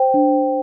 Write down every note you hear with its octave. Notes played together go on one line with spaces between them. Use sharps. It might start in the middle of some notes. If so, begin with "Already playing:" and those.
Already playing: C5 G5
D4